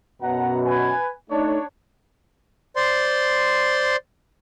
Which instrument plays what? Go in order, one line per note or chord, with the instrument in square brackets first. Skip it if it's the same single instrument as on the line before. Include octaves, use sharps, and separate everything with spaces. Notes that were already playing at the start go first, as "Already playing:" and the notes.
[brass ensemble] F#2 B2 [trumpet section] F#5 A#5
[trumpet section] B4 G#5
[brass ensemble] A3 D#4 [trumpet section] D4 C#5
[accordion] C5 D5 C6